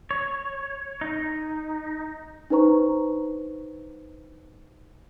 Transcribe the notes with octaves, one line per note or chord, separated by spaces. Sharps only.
C#5
D#4
D4 D#4 B4 C5 A#5 C#6